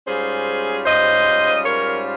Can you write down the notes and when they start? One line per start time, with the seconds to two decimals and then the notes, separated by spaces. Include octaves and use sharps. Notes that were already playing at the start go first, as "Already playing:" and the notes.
0.07 G#2 G3 C#4 F4 G#4 C5
0.85 C5 D#5
1.64 A#4 C#5